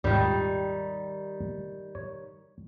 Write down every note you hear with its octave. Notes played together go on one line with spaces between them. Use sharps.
G#1 D#2 A#2 D#3 G3
C#5